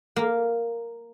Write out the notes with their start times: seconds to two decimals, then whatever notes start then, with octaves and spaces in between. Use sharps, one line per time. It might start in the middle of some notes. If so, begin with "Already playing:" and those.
0.16 A#3